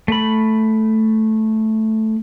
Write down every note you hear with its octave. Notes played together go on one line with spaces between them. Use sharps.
A3 B5